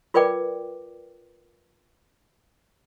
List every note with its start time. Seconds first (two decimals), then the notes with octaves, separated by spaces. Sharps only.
0.14 F4 A#4 B4 D5 G5 D6